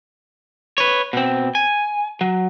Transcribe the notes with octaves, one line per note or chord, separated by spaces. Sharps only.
B4 C#5
B2 C4
G#5
F#3